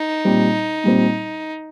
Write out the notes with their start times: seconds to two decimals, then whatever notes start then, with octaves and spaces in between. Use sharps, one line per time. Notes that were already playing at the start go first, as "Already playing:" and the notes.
Already playing: D#4
0.25 A#2 G3 C4
0.84 A#2 G3 C4